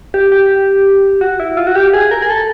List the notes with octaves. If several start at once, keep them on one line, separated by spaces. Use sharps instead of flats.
G4
G4
F#4
E4
F4
F#4
G4
G#4
A#4
G#4
A4